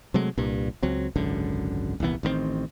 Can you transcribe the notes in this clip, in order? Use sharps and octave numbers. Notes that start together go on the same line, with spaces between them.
C3 F#3 G#3 A3
C2 G2 A#2
C#2 F#3 C4
G#1 C#2 F#2 D3
D#1 C2 E3 B3
A1 D#3 G#3 C4